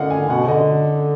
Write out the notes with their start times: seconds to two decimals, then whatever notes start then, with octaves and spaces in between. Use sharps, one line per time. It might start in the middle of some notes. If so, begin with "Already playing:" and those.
Already playing: D3 D#5 F5 F#5
0.10 G#5
0.29 B2 F#5
0.48 D3 D#5